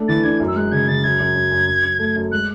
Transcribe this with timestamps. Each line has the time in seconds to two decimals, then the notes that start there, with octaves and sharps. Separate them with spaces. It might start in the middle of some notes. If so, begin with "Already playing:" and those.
Already playing: A3 D4
0.08 E3 A6
0.24 D4 G#6
0.40 F#2
0.47 E6
0.56 G#3 F#6
0.72 C#3 G#6
0.88 C#3 A6
1.04 F#2 G#6
1.20 F#2
1.35 F#2
1.52 F#2
1.68 F#2
1.84 F#2
1.99 A3
2.16 F#2
2.32 G#3 F#6